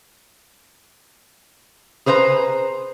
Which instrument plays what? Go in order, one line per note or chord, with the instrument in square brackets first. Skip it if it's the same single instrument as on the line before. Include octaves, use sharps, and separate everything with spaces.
[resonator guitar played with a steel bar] G#4 B4 C5 F5 A#5